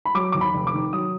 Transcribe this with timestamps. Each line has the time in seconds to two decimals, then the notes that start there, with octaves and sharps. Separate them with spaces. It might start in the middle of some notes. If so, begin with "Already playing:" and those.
0.05 B5
0.15 F#3 D6
0.32 D#2 D6
0.41 B5
0.54 F1
0.67 D6
0.73 D#3
0.93 F#3 D#6